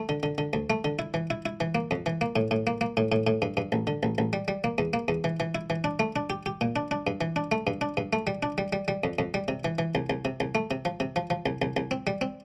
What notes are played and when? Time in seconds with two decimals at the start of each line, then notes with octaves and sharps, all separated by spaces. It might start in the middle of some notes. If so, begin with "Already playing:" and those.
Already playing: A3
0.09 D3
0.23 D3
0.38 D3
0.53 D2
0.70 A3
0.85 D3
0.99 E4
1.14 E3
1.30 E4
1.46 E4
1.60 E3
1.75 A#3
1.91 F2
2.06 E3
2.21 A#3
2.36 A2
2.51 A2
2.67 A#3
2.81 A#3
2.97 A2
3.12 A2
3.27 A2
3.42 G2
3.57 G2
3.72 A1
3.87 D3
4.03 A1
4.18 A1
4.33 G3
4.48 G3
4.64 A#3
4.78 E2
4.93 A#3
5.08 E2
5.24 E3
5.40 E3
5.55 E4
5.70 E3
5.84 D4
5.99 A3
6.16 D4
6.30 G4
6.46 G4
6.61 A#2
6.76 D4
6.91 D4
7.07 G2
7.21 E3
7.36 D4
7.52 A3
7.67 G2
7.81 D4
7.97 G2
8.13 A3
8.27 G3
8.43 D4
8.58 G3
8.73 G3
8.88 G3
9.04 F2
9.19 F2
9.34 G3
9.48 C3
9.65 E3
9.79 E3
9.95 C2
10.10 C2
10.25 C3
10.40 C2
10.55 A3
10.71 C3
10.85 F3
11.00 C3
11.16 F3
11.30 F3
11.46 C2
11.62 C2
11.77 C2
11.91 C4
12.07 G3
12.21 C4